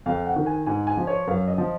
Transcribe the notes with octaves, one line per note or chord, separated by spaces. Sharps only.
F2 F5
F#5
D#3
G#5
G#2 G#5
G#5
F3
C#5
F#2 F5
D#5
F3